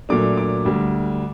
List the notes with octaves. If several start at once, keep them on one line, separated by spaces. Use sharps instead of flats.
A#2 F#3 A3 D4 D6
D6
D2 D3 G3